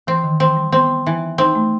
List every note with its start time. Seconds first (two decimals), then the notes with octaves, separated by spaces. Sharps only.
0.07 E3 C4
0.24 D#3
0.40 E3 C4
0.57 G3
0.72 B3 C4
1.06 E3
1.38 C4 D#4
1.55 A3